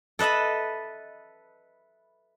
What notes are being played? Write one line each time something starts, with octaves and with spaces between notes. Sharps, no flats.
A4 B4 D#5 E5 B5